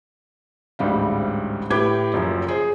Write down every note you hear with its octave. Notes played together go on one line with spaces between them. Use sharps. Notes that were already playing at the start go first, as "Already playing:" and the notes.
A1 D2 G#2 G3 C4 F5
A2 G4 B4 D6 G#6
F#1 F#2 F3
G#4 C5